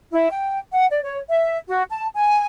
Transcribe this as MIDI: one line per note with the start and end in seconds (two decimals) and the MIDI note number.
0.12 0.28 64
0.30 0.58 79
0.72 0.86 78
0.90 0.99 74
1.03 1.19 73
1.29 1.57 76
1.67 1.83 66
1.89 2.07 81
2.14 2.46 80